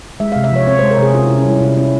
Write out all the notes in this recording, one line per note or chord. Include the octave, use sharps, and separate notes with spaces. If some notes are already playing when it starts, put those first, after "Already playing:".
G#3 E5
F5
C3
E5
F3 C#5
C4 C#5
C5
G#3
A#4
C3 G#4
C#4 F4
E4
C3
C#4
G3 E4
C3 E4
C#4 E4